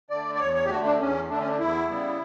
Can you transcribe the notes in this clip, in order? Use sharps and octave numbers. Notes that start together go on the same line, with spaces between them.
D3 A3 D5
D5
E2 C#5
C#5
G4
D3 A3 F#4
D4
E2 C#4
D3 A3 D4
C#4
D4
E2 E4
C#3 G3 B3